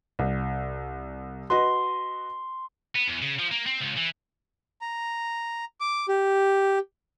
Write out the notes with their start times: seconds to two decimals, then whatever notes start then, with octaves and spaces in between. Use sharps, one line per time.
0.19 C2
1.50 F#4 B4 D#5 C6
2.96 B3
3.08 E2
3.22 C#3
3.39 F3
3.51 A#3
3.67 C4
3.82 C#2
3.97 E3
4.81 A#5
5.80 D6
6.08 G4